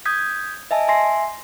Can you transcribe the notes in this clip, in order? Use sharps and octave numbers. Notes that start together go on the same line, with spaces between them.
D#6 G6 G#6 B6
D#5 E5 G#5 A5
E5 G#5 C6 A#6 C7